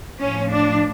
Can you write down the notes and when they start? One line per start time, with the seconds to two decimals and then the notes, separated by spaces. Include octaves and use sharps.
0.20 A2 F3 C#4
0.51 D4